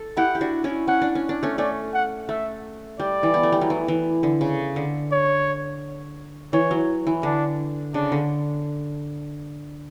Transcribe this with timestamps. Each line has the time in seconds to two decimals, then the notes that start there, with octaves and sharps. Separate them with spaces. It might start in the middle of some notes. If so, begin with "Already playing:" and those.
Already playing: A4
0.17 E4 G4 F#5
0.35 G4
0.41 D4 F#4
0.64 C#4 E4
0.88 C#4 F#5
1.02 D4
1.15 C#4
1.29 D4
1.43 A3 C#4
1.58 A3 C#4 D5
1.94 F#5
2.29 A3 E5
3.00 G3 D5
3.23 E3
3.34 B3
3.43 A3
3.52 G3
3.61 F#3
3.70 E3
3.88 E3
4.23 D3
4.41 C#3
4.76 D3
5.11 C#5
6.53 E3 C#5
6.71 F#3
7.07 E3
7.23 D3 D4
7.94 C#3 D4
8.12 D3